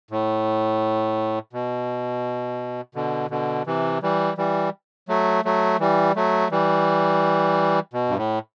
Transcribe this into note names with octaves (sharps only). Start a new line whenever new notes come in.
A2
B2
B2 D3
B2 D3
C3 E3
E3 G3
E3 G3
F#3 A3
F#3 A3
E3 G3
F#3 A3
E3 G3
B2
G2
A2